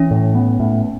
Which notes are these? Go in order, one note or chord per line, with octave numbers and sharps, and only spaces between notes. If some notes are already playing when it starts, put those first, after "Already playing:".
Already playing: E3 C#4
A2
B3
A2